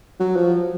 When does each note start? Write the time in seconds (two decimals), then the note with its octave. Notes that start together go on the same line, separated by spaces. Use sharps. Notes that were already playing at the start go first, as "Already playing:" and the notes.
0.20 F#3
0.36 F3